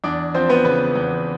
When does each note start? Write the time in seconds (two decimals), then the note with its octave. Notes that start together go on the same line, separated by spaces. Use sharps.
0.04 E2 D4 D5
0.34 F3 C4 C5
0.49 B3 B4
0.65 C#3 B3 B4
0.96 E2